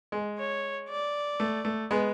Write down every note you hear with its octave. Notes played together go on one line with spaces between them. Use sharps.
G#3
C#5
D5
A3
A3
G#3 B3